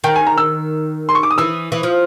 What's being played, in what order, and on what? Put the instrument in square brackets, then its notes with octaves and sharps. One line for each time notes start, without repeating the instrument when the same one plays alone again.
[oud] D#3 [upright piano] G5
[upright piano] G#5
A#5
E6
C6
C#6
D6
D#6
[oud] E3 [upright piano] E6
[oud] E3
F3